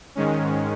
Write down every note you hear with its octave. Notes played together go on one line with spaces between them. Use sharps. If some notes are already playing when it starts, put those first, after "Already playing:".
G#2 D#3 G#3 C#4